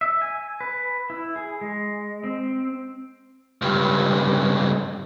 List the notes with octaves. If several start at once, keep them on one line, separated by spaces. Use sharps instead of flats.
E5
G#5
B4
E4
G#4
G#3
C4
C#2 G2